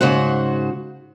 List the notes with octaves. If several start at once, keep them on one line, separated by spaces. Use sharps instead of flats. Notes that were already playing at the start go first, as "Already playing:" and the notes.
G#2 C#3 F#4 C5 F#5